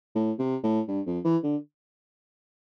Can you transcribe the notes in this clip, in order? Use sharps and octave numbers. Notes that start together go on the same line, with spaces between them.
A2
C3
A2
G2
F2
E3
D3